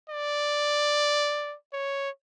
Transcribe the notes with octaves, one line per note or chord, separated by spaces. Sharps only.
D5
C#5